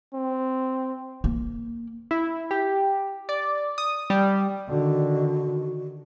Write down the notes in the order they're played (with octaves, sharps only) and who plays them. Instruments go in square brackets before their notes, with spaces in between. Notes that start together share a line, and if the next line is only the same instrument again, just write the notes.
[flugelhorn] C4
[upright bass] A#3
[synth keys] E4
G4
D5
D#6
G3
[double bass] D3 D#3 [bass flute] F#4